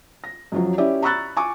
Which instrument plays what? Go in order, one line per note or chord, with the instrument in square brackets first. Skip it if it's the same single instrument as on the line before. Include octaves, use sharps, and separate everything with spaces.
[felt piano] A#6
F#2 F3 F#3
C#4 E4 G4 D5 E5
A#5 B5 C#6 E6 F#6 A6
G#5 C#6 D6